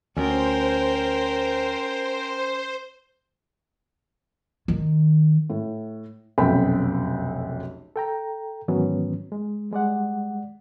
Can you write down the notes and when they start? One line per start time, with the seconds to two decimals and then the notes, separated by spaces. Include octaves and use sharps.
0.17 D2 C#4 A#4 C5 G5
4.68 D#3
5.50 A2
6.38 F1 B1 F#2 G5 B5
7.96 A4 G5 A#5
8.68 G#2 D#3 E3 F#3 B3 C#4
9.32 G#3
9.71 G3 G#3 D5 F#5